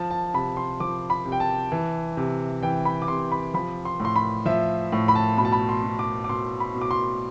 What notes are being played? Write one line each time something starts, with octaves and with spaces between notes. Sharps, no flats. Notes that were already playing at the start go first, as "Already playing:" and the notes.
Already playing: F3 A5
A5
C3 B5
C6
F3 D6
B5
C3
G5
A5
E3
C3
E3 G5
B5
D6
C3 C6
B5
F3 B5
C6
A2
C6
B5
F3 E5
A2
B5
A5
B2 B5
A5
B5
C6
B2
D6
D6
B2 C6
B5
B2
D6
C6